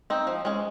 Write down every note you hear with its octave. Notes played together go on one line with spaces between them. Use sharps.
C4 D#4
F3
G#3 C#4